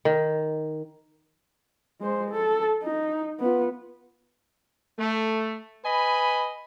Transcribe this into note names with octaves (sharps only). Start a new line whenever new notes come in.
D#3
G#3 C5
A4
D#4
B3 F4
A3
B4 D#5 G#5 B5